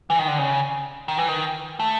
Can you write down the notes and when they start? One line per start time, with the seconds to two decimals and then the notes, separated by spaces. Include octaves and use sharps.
0.10 E3
0.19 D#3
0.28 D3
0.39 C#3
1.08 D#3
1.18 E3
1.28 D#3
1.80 A3